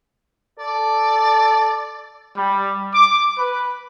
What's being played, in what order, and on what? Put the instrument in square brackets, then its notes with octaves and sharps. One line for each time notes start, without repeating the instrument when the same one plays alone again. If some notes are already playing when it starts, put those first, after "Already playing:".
[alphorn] A4 [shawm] D5
[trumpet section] G3
D6
B4